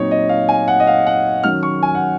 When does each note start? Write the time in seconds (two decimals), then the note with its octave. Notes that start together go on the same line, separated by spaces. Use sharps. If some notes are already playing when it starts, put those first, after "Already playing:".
Already playing: A#2 F#3 C4 D#4 C#5
0.11 D#5
0.29 F5
0.49 G#5
0.68 F#5
0.80 D#5
0.87 F5
1.07 F#5
1.44 D#3 F#3 C#4 F6
1.63 C#6
1.83 G#5
1.95 F#5